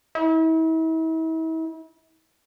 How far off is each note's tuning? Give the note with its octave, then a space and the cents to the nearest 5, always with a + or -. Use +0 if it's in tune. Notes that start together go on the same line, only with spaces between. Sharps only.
E4 -40